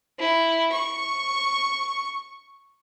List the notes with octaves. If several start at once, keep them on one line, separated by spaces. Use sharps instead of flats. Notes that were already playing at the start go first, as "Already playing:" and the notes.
E4
C#6